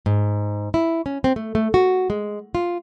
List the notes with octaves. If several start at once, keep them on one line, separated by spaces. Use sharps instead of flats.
G#2
E4
C#4
C4
A3
A3
F#4
G#3
F4